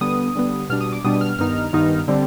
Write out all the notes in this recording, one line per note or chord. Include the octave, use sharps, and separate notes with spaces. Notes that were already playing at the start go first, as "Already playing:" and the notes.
D3 G3 B3 D#6
D3 G3 B3
B2 G3 D4 F6
D#6
D6
B2 G3 D4 D#6
F6
G2 D#3 B3 D#4 F6
G2 D#3 B3 D#4
D3 G3 C4